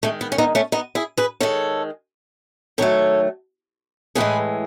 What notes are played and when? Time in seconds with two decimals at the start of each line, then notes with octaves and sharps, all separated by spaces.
0.03 D#3 G#3 A3
0.21 B3
0.32 C#4
0.38 B3 D#4
0.55 A3 C#4
0.72 B3 D#4
0.95 E4 G#4
1.17 G#4 B4
1.40 D#3 G#3 A4 C#5
2.78 D#3 F#3 A3 A4 C#5
4.15 A2 E3 G#3 G#4 B4